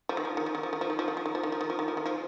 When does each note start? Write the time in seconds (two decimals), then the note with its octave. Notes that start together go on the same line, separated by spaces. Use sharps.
0.09 F3
0.17 D#3
0.25 F3
0.37 D#3
0.46 F3
0.55 D#3
0.63 F3
0.73 D#3
0.81 F3
0.90 D#3
0.99 F3
1.08 D#3
1.17 F3
1.26 D#3
1.35 F3
1.43 D#3
1.52 F3
1.61 D#3
1.70 F3
1.79 D#3
1.88 F3
1.97 D#3
2.06 F3